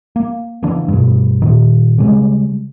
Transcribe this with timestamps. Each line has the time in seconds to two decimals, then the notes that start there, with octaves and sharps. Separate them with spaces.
0.16 A#3
0.63 C#3 E3 A#3 D4
0.88 G2 B2
1.42 A#2 D#3
1.98 C#3 G3 G#3